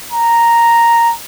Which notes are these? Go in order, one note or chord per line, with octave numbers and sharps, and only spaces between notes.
A#5